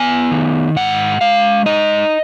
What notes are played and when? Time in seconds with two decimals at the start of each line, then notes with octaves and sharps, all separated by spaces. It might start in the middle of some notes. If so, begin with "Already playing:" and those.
Already playing: B3 G#5
0.31 D#3
0.76 G#2 F#5
1.21 G#3 F5
1.66 D#4 D#5